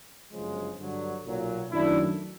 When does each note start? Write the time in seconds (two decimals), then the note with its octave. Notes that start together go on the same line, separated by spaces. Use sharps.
0.32 G1 F#2 C#3 F3 G#3
0.79 G2 D3 F#3
1.26 B1 A#2 F#3
1.72 F#2 D#3 F#3 A3 D4 E4